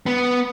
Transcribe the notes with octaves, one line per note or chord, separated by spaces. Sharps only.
B3